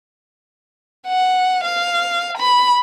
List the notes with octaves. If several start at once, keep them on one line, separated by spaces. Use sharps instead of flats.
F#5
F5
B5